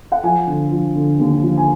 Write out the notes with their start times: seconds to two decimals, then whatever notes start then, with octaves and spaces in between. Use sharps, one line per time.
0.12 F#5
0.23 F3 G#5
0.47 D3
0.71 F3
0.95 D3
1.20 D#2
1.43 F3
1.57 G#5